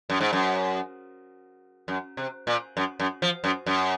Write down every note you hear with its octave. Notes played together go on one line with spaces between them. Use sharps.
F#2
G#2
F#2
F#2
C3
A#2
F#2
F#2
F3
F#2
F#2